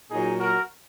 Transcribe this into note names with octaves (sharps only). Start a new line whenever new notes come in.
A#2 F#3 D#4 G#4
F#4 A#4